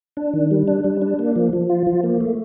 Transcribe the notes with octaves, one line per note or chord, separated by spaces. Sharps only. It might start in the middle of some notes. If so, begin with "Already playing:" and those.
D4
D#3
G3
D4
G3
D4
A#3
F3
F3
F4
F3
A#3
A3